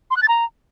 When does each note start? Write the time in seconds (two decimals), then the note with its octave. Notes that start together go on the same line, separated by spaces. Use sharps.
0.11 C6
0.17 F#6
0.22 A6
0.28 A#5